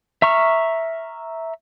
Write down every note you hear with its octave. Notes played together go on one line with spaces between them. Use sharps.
E5 A#5 C#6 F6